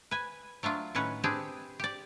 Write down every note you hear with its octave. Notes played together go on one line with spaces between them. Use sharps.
B4 G#5
F#3 A3 D4 F4
A2 D#3 C#4 B4 F#5
C4 D4 G4 G#4 B4
G4 D5